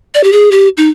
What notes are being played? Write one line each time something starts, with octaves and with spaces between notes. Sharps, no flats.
D5
G4
G#4
G4
D#4